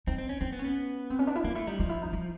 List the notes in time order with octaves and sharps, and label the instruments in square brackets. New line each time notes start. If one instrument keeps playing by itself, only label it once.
[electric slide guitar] C4 [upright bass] D#4
[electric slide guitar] C4
C#4
[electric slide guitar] C4 [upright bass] D#4
[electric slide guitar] B3
[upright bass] C#4
[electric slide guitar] B3
[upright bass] C4
C#4
D4
E4
[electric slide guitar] A#3 [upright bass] D#4
[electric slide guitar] A3 [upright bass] E4
[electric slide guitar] G3 [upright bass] D#4
[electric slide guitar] F3 [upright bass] D#4
[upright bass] E4
D#4
D#4